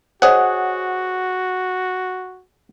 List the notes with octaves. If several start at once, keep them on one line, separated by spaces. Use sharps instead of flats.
F#4 G#4 C5 C#5 D#5 F#5